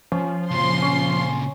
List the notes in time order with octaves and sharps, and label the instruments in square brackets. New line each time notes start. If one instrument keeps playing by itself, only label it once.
[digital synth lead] F3 [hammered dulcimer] C#4
[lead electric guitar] A#2 C#3 [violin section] C6
[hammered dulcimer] C#4